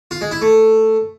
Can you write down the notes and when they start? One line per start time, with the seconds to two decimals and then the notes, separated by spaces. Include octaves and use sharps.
0.11 F4
0.21 G#3
0.31 E4
0.42 A3